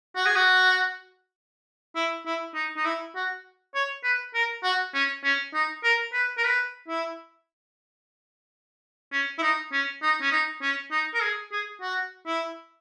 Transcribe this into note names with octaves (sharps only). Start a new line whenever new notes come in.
F#4
G#4
F#4
E4
E4
D#4
D#4
E4
F#4
C#5
B4
A#4
F#4
C#4
C#4
D#4
A#4
B4
A#4
B4
E4
C#4
E4
D#4
C#4
D#4
C#4
D#4
C#4
D#4
A#4
G#4
G#4
F#4
E4